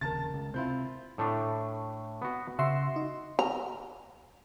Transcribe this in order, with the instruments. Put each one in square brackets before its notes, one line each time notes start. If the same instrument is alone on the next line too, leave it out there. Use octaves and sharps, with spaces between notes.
[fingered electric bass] F1 D#2 C#3 [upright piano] A#4 A5 A6
[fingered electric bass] C#2
[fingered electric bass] C3 [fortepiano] C4 E4 F4 [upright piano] G6
[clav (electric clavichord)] A2 A3 D4
B3 F#4
[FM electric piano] C#3 E5 C6 [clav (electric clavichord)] F#4
[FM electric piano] D#4
[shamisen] A#5